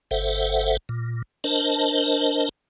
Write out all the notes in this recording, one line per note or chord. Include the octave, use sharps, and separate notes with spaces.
G1 A4 C5 E5 F#5
A#2
D4 A#4 C5 D#5 A5